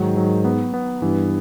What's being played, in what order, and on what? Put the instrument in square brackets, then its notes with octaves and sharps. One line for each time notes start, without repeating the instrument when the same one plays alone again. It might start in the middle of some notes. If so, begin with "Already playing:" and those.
Already playing: [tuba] G#2 [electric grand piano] D#3 F#3
[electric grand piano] F#3
B3
B3
[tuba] G2 [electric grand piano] E3